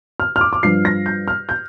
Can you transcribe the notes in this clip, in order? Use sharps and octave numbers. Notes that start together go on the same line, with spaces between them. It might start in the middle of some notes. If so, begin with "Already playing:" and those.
F6
F6
D6
D6
G2 F3 C7
A#6
G6
F6
G6